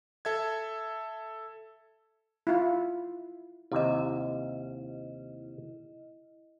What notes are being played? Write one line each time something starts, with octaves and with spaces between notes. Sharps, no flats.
A4 E5 G#6
E4 F4
D#2 C3 E4 D#5